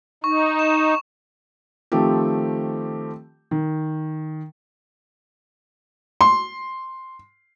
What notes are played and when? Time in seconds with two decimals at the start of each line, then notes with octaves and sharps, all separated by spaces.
0.24 D#4 C#6
0.59 E7
1.92 D#3 F3 A3 C4 G4
3.51 D#3
6.21 C6